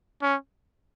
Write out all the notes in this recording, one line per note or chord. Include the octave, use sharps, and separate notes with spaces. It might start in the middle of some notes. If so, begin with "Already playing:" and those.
C#4